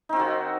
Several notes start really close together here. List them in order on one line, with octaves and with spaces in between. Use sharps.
D#4 C4 F#4 D#3